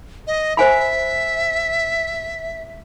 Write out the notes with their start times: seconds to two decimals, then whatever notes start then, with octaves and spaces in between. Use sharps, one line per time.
0.27 D#5
0.57 C5 E5 G#5 B5